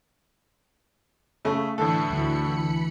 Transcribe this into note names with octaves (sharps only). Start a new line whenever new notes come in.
C#3 A3
A2 D3 E3 A3 A4 B5 C#7
D2